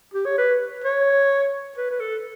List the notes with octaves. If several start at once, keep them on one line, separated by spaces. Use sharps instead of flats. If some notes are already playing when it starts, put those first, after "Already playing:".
G4
C#5
B4
C#5
B4
B4
A4